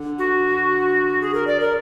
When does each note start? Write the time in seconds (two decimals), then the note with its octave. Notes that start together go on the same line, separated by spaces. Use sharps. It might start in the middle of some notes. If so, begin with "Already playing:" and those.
Already playing: D3
0.18 F#4
1.22 G#4
1.34 A#4
1.47 D5
1.60 A#4